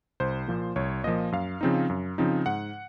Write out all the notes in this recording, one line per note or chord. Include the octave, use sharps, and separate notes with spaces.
C2 C5
A#2 F3 A#3
C2 C#5
A#2 F3 A#3 D#5
F#2 F5
C#3 F3 C4 D#4
F#2
C#3 F3 C4 D#4
G#2 F#5